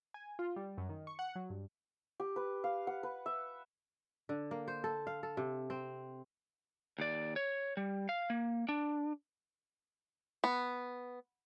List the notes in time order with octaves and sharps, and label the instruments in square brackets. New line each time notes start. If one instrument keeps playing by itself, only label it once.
[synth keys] G#5
F4
G3
F#2
D#3
C#6
F#5
F#3
G2
[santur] G4
B4
F5
F#5
B4
E5
[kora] D3
A#3
C5
A4
F5
A4
C3
C4
[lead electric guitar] D#2 D5
C#5
G3
F5
A#3
D4
[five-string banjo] B3